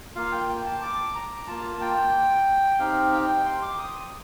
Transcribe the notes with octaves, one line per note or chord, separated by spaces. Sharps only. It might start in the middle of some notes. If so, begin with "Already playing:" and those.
A#3 F4 F5
G5
G5
A5
D6
A#5
A#3 F4 A5
G5
C4 D#4 G4 F5
G5
C6
D6
D#6